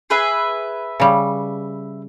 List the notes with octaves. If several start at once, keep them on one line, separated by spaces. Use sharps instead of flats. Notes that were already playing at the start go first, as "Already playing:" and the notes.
G#4 B4 E5
C#3 G3